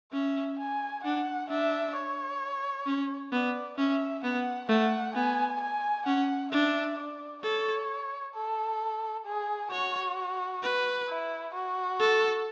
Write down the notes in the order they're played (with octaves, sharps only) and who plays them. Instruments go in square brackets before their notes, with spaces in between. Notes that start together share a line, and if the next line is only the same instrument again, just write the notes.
[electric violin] C#4 [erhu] E5
[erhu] G#5
[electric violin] D4 [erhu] F#5
[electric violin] D4 [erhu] E5
[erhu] C#5
[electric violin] C#4
[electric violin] B3 [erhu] D5
[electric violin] C#4 [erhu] E5
[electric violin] B3 [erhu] F#5
[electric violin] A3 [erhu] F#5
[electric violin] B3 [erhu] G#5
[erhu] G#5
[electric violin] C#4 [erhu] F#5
[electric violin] D4 [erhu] E5
[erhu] D5
[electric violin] A4 [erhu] C#5
[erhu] A4
G#4
[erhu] F#4 [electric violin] C#5
[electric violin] B4
[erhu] E4
F#4
[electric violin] A4